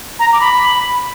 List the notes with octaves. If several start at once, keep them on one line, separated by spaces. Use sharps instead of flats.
A#5
D6
B5